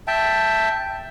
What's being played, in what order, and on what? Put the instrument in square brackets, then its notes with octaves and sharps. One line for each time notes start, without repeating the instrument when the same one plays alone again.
[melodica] E5 G5 A5